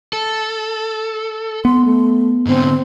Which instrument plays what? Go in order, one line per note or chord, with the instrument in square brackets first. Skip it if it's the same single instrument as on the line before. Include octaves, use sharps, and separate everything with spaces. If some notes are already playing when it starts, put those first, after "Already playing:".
[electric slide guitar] A4
[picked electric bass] B3 [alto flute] C6
[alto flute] A3
[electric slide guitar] G#2 D3 [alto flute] C4